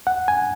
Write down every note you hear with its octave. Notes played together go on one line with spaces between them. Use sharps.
F#5
G#5